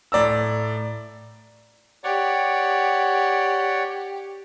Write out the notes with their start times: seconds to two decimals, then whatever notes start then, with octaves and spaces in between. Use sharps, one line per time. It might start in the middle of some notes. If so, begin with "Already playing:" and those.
0.12 A2 D5 A#5 E6
2.04 G4 C#5 D5 F#5